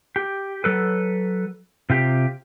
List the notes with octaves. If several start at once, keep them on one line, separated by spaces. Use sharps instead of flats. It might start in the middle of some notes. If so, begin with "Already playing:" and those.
G4
F#3 A4 B4
C3 F4 G4